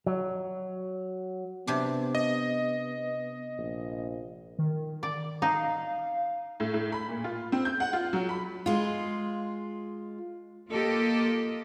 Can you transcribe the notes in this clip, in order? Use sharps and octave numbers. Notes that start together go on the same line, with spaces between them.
F#3
C3 B3 D4
D#5
A#1
D#3
D5
D#4 F5
A2
A2
B5
A#2
F4
C4
G6
F#5
F4
F#3
B5
G#3 F4
A#3 F4 G4 A4 D#5